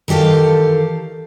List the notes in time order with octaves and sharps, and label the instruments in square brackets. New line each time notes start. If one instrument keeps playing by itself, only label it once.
[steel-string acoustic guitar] D#3 E3 G4 A4 F5